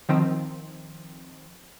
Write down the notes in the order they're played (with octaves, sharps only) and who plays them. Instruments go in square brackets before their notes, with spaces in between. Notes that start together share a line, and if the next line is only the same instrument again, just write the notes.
[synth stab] D#3 F3 C4